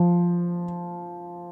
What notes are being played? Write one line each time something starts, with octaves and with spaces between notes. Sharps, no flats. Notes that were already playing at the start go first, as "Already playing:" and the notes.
Already playing: F3